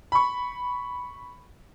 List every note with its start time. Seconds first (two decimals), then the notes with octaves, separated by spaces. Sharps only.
0.12 B5 C#6